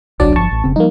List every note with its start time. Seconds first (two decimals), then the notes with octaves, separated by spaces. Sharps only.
0.20 D1 G1 C2 F#3 D4 D5
0.36 G1 F3 A5 C#6
0.51 A1
0.64 F1 C#3 C4
0.76 F3 G3 A#3 D#4